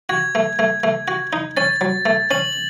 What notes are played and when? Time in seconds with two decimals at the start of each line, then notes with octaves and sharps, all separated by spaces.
0.09 F#4 G#6
0.35 A3
0.59 A3
0.84 A3
1.08 F#4
1.33 D#4
1.57 C#4 A6
1.81 F#3
2.06 A3
2.31 C#4 F#7